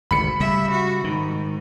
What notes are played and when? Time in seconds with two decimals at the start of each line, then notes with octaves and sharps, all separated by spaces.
0.11 G#1 D2 C3 B5 C#7
0.40 C#3 G3 E5
0.71 F#4
1.04 G#2 D#3